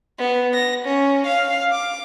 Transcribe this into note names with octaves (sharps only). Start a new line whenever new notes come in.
B3
A#6
C#4
F5
D6